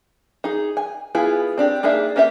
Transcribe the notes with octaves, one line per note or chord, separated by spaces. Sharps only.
D#4 G#4
G#5
B3 E4 F4 G#4 G#5
C4 D4 G4
A#3 D4 D#4 G#4 E5
A#3 C#4 G4 D#5 E5